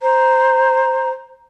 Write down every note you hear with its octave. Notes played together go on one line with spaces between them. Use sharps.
C5 A#5